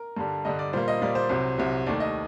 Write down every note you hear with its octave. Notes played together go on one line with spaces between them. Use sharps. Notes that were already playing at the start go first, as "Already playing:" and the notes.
Already playing: A#4
G2 D3 G3
G2 D3 G3 D#5
D5
A#2 G3 A#3 C5
D#5
A#2 G3 A#3 D5
C5
C2 C3 F#3
C2 C3 F#3
D#2 D#3 A3 D5
D#5